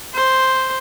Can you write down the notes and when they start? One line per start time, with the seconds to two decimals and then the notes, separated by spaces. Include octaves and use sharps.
0.14 C5